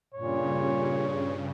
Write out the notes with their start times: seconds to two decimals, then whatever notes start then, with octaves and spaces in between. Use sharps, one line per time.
0.14 G2 A#2 C#3 C#5